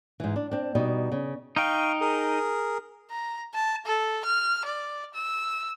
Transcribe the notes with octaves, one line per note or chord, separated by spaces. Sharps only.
G#2 E3
D4
C4 D4
B2 G3 D#4
C#3
D#4 F5 G5 C#6
G#4 A#4
A#5
A5
A4
F6
D5
E6